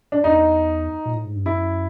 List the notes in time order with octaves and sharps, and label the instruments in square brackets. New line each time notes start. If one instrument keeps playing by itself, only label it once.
[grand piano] D4
[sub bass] E2 [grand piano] D#4
[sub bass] A#2
A2
G#2
G2
[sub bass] F#2 [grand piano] E4